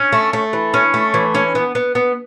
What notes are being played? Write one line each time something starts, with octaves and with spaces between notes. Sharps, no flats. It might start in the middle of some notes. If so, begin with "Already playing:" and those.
Already playing: C#4
A3
A3
E3
C#4
A3
E3
C#4
B3
B3
B3